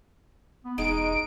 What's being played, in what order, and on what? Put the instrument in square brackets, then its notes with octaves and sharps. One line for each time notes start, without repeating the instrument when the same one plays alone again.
[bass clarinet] B3
[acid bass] E1 [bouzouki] G#3 [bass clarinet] D#4 [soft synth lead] D7